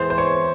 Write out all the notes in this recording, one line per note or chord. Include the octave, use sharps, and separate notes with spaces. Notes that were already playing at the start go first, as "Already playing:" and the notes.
Already playing: E2 E3 G#3 C5
C5
C#5